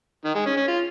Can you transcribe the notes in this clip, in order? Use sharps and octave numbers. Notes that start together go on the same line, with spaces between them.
D#3
G#3
C#4
C#4
F4